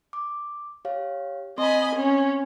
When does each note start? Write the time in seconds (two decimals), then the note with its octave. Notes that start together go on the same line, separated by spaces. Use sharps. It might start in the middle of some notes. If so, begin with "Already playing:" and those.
0.13 D6
0.85 G4 C#5 F5
1.58 C4 D#5 G#5 B5 C6
1.95 C#4